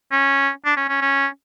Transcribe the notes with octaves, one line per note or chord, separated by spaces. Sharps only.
C#4
D4
C#4
C#4
C#4